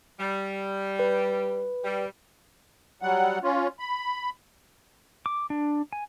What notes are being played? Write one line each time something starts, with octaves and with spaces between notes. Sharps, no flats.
G3
B4
G3
F#3 G3 F#5
C#4 F4
B5
D6
D4
G#5